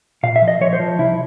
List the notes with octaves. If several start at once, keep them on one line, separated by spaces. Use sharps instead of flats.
A#2 F5
E5
F3
D#5
F3 C#5
C5
F3
C2 E4